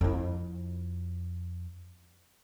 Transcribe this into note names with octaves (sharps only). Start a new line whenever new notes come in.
F2 E4